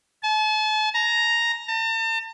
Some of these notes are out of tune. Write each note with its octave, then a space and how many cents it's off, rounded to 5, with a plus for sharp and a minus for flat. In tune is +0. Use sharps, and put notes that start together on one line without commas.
A5 -40
A#5 +0
A5 +40